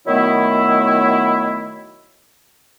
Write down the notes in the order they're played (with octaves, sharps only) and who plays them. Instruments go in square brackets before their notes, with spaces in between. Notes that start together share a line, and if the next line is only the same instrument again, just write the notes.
[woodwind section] D#3 F#3 A3 B3 E4